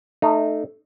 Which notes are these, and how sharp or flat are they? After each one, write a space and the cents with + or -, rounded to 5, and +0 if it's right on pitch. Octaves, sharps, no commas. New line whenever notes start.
A3 +0 D#4 -20